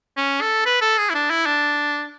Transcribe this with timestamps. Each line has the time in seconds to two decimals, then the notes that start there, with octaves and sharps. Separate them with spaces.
0.17 C#4
0.41 A4
0.65 B4
0.82 A4
0.98 G#4
1.10 E4
1.15 D4
1.30 E4
1.46 D4